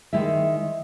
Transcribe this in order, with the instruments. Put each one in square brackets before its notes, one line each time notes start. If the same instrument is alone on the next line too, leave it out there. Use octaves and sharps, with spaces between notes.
[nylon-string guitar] D#3 G#3 E4 E5